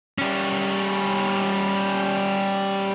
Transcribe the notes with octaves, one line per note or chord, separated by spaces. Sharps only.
G3 C#4